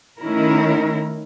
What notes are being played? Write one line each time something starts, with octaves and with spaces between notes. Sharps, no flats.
D#3 A3 C#4 E4 A#4